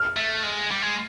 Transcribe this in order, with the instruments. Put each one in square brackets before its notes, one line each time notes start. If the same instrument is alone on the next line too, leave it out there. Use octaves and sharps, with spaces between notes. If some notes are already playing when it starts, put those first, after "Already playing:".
Already playing: [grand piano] F6
[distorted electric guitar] A3
G#3
G3
G#3